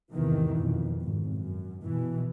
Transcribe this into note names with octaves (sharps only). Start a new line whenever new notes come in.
G#1 E2 C3 D#3 E3
F2 B2
G#1
F#2
B2 E3